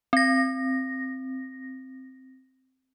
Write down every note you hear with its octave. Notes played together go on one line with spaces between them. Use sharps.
C4 A#6